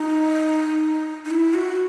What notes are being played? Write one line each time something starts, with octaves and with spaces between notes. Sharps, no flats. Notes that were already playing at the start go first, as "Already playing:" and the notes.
Already playing: D#4
D#4
E4
F#4